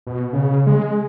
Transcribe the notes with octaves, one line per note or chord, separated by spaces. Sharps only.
B2
C#3
G#3